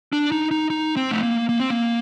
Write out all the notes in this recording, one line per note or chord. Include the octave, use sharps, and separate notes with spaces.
D4
D#4
D#4
D#4
C4
A3
A#3
A#3
C4
A#3